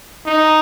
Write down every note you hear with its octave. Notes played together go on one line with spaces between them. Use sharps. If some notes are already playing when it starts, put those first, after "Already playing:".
D#4